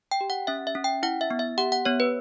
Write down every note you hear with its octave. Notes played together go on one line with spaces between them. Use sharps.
G5
G4
F#5
C#4 E5
E5
C#4
G5
E4 F#5
E5
B3
E5
G4 F#5
F#5
B3 C#5
B4